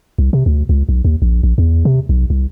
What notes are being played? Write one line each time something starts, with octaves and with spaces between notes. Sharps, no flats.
C2
C3
D2
C#2
B1
D#2
A#1
A#1
E2
C3
B1
C2